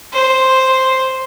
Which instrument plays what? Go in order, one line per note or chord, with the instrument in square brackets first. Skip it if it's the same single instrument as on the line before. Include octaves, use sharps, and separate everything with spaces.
[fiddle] C5